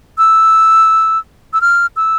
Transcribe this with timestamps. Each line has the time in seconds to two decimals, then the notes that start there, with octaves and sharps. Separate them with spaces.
0.18 E6
1.53 E6
1.61 F6
1.96 E6